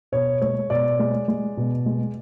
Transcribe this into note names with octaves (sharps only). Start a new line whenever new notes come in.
B2 C#5
G#3 C#5
B2 D5
G#3
G#3
B2
G#3